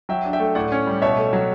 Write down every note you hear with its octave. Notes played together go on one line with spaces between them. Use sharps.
F#3 E5 G5
D4
E5 G5
A3
A2 D5 F#5
C#4
G3
B2 C#5 E5
A3
F#3